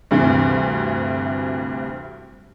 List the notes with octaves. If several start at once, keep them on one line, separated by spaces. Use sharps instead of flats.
D2 G2 C3 E3